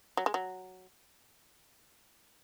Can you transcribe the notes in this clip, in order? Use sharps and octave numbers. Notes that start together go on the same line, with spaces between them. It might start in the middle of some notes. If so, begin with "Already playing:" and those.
F#3
G#3
F#3